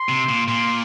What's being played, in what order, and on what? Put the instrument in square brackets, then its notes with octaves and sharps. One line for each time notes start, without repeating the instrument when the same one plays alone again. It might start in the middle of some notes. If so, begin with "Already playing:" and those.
Already playing: [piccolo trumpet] C6
[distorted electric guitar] C3
A#2
[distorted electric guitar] A#2 [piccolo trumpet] C6